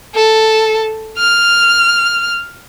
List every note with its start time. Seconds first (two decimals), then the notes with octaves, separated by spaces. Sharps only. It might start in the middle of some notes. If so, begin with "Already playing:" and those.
0.15 A4
1.17 F6